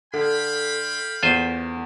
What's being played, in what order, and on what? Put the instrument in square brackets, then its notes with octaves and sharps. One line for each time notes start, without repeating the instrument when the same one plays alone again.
[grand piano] D3 [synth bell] A4 [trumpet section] F5 G5 B5
[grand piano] E2 [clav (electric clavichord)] F4 C5 G#5